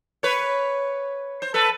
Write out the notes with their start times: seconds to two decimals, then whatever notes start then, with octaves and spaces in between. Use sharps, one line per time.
0.23 B4 C#5
1.42 C5
1.54 A4 B4